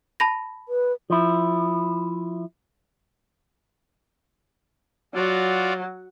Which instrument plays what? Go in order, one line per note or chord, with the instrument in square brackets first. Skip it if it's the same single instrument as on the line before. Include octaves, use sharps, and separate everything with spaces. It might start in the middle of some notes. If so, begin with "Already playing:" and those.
[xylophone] A5 B5 A#6
[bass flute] B4
[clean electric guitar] F3 E4
[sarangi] F#3 [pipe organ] F4 F#4 D5